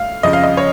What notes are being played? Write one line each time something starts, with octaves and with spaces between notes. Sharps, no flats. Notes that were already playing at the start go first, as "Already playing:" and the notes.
Already playing: A3 F5
F2 C#3 F3 D#5
F5
D#5
C#5